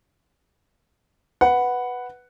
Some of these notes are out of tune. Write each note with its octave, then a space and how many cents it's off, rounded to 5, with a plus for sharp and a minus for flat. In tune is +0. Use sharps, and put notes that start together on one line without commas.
B4 +0 F#5 +0